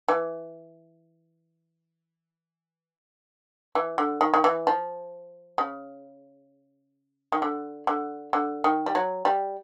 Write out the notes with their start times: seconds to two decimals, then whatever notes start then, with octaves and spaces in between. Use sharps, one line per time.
0.08 E3
3.75 E3
3.98 D3
4.21 D#3
4.34 D#3
4.44 E3
4.67 F3
5.58 C#3
7.32 D#3
7.42 D3
7.87 D3
8.33 D3
8.64 D#3
8.86 G3
8.95 F#3
9.25 G3